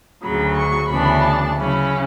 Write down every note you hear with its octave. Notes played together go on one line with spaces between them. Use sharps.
D2 C#3 F#3 B5
C#6
D2 C#3 E3 B3 D4 B5
A5
C#3 F#3 C#4 E4 B5